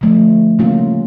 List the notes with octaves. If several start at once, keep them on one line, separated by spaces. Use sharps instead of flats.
D3 F3 A3
C#3 G3 A#3 C#4 F4